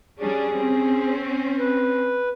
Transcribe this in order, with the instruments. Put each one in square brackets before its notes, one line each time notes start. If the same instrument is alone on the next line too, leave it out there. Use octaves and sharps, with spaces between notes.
[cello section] G3 C#4 D4 [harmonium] G#4
[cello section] C4 C#4
[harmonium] B4